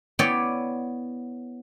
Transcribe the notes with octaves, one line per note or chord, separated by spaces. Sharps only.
B3 E4 C#5 D5 G5